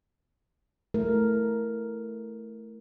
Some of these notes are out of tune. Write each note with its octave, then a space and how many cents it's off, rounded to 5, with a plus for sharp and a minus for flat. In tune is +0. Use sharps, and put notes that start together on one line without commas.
A3 +0 E4 +0 A#4 +0